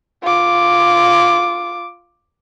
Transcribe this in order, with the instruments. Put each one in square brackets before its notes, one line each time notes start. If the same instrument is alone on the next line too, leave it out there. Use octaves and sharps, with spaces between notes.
[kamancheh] F4 D6